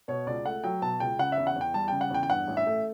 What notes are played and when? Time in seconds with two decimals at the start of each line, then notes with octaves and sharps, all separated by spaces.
0.08 B2 C#5
0.27 C#2 D5
0.45 A3 F#5
0.64 F#3 G5
0.82 B2 A5
1.00 C#2 G5
1.19 C#3 F#5
1.32 E5
1.38 E2
1.47 F#5
1.56 E2 G5
1.74 G3 A5
1.88 C#3 G5
2.01 F#5
2.11 E2 G5
2.23 G5
2.30 G2 F#5
2.48 A1
2.57 E5
2.67 A3